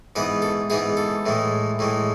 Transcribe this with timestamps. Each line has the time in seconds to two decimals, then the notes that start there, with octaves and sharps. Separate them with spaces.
0.16 G#2 E3 B3 B4
0.42 A4
0.70 G#2 E3 B3 G#4
0.97 A4
1.26 A2 E3 G#3
1.79 A2 E3 G#3